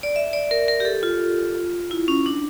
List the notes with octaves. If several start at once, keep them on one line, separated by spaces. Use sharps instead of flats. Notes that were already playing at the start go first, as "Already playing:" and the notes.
D5
E5
D5
A#4
A#4
G4
A4
F4
E4
C#4
D4